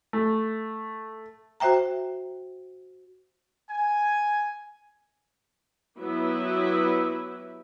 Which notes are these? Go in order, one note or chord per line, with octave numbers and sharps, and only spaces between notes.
A3
F#4 C5 E5 G5 A#5
G#5
F#3 B3 E4 G4 B4 E5